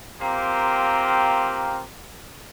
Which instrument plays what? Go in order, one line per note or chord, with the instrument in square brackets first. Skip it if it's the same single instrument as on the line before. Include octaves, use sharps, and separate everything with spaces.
[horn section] A#3 C4 F4 G4 A#4